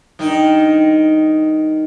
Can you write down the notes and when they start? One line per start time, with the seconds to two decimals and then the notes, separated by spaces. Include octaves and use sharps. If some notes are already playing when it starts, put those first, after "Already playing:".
0.19 G2 D#3 D#4